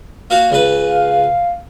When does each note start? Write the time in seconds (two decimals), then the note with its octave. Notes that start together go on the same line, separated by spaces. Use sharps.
0.30 A#3 F#4 F5
0.50 C#2 C#3 B4
0.88 F5